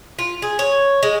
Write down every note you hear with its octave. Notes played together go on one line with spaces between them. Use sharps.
F4
G#4
C#5
G#3